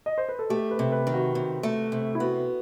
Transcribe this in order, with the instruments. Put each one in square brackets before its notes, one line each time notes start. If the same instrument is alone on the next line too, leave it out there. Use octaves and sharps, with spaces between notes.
[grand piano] D#5
C5
B4
A4
[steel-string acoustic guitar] A3 [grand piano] G4
[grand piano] B4
[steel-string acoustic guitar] C3
[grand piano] B4
[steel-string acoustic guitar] D#3
[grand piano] F#4
[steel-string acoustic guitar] C3
A3
C3
[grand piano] E4
[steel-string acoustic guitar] B3 [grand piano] F#4